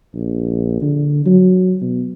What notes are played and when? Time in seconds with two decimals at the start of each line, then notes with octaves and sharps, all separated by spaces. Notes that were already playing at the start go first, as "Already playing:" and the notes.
0.14 A#1
0.81 D3
1.26 F#3
1.81 B2